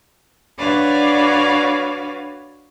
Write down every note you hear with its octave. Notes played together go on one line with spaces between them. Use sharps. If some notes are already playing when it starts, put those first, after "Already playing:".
D4 F#4 B4 C#5 D5 F5